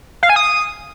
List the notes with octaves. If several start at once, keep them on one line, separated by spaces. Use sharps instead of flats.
F5
G#5
D#6